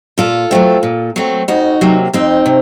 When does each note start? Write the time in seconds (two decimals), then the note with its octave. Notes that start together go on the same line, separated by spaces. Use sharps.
0.18 A#2 F4 A4
0.51 F#3 A3 C4
0.83 A#2
1.16 F#3 A3 C4
1.48 F2 D#4 F#4
1.81 C3 F#3 A#3
2.13 F2 C4 D#4
2.46 C3